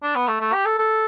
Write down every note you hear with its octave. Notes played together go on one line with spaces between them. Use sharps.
D4
B3
A3
A3
G4
A4
A4